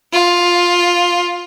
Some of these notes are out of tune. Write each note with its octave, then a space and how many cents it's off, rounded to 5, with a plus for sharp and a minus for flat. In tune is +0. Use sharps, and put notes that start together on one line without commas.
F4 +10